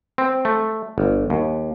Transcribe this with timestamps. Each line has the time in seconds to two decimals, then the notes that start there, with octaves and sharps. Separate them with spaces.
0.18 C4
0.45 A3
0.98 G1
1.30 D#2